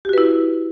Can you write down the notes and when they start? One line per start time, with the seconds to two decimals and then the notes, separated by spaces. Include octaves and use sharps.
0.05 G4
0.09 F#4
0.13 B4
0.18 E4